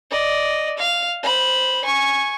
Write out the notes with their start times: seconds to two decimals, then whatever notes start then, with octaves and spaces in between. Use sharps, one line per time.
0.11 D5 D#5
0.78 F5
1.23 C5 B5
1.84 G#5 C#6